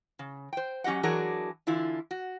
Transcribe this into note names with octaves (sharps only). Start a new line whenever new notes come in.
C#3
C5 G5
F#3 C#4 G4 D#5 F#5
E3 F#3 D4 F#4 G#4 A#4
D3 E3 E4 F4
F#4